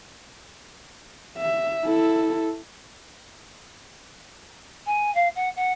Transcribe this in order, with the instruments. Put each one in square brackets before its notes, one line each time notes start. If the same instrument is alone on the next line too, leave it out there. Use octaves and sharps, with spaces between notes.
[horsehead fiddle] E5
E4 A4
[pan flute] G#5
F5
F#5
F#5